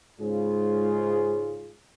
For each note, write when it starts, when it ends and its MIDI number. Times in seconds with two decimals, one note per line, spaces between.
0.20 1.74 44
0.20 1.74 49
0.20 1.74 65
0.20 1.74 68